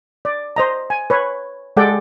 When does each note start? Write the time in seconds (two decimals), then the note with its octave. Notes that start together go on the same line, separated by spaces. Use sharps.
0.25 D5
0.56 C5 D#5 A#5
0.90 G#5
1.10 B4 C#5
1.77 G#3 G4 A4 D5 F#5 G5